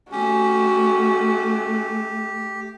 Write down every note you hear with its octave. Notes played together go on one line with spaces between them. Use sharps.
A3 C#4 F#4 G4